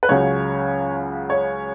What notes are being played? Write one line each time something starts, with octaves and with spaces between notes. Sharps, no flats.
B4
C#2 C#3 F#3 C#5
C#5